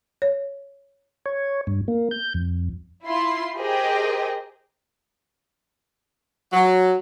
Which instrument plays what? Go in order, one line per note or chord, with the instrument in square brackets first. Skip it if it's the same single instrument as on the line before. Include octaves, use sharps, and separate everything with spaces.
[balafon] C#5
[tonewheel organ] C#5
G2
A#3
G6
F2
[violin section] E4 F4 C6
G4 G#4 A#4 C5 D#5 G5
[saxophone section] F#3